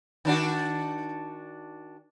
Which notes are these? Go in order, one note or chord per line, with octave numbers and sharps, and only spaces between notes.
D#3 D4 F#4